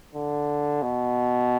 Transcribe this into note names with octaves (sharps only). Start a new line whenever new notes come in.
D3
B2